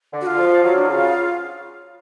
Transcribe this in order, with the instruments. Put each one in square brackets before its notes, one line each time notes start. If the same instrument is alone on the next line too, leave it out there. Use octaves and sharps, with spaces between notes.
[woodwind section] D3
[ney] F#4
F4
[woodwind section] F3
[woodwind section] F#3 [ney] F4
[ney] D4
[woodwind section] C#3 [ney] F4